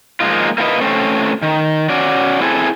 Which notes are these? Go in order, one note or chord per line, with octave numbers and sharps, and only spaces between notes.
F3 G#3 A#3 D#4 F4
A#3 C4 E4 F4 B4 D#5
A3 C4 C#4
D#3
C#4 F#4 D5
C4 E4 G#4 A4